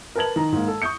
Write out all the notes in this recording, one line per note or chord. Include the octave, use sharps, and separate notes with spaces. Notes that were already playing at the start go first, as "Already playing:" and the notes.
A#4 B4 A5 G#6 F#7
D#3 A#5
G#2 A#3
A4
C#6 D#6 G6 C#7